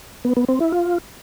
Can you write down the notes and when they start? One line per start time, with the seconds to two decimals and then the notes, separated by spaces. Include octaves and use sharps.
0.25 B3
0.37 B3
0.48 C4
0.60 E4
0.72 F4